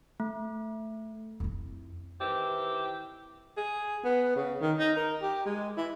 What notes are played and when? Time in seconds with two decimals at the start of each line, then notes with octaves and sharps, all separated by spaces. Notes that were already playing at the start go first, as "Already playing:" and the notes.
0.20 A3
1.40 F2 E4
2.20 D#3 E3 C4 E4 G4
3.57 G#4
4.04 B3
4.36 C#3
4.61 D#3
4.79 D#4
4.96 A#4
5.21 G4
5.46 G#3
5.77 E4